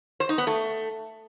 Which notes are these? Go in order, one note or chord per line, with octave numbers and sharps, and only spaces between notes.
C5
D#4
B3
A3